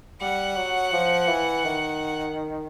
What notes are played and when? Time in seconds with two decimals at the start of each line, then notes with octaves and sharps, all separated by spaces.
0.21 G3 F#5
0.57 F#3
0.93 F3
1.28 E3
1.65 D#3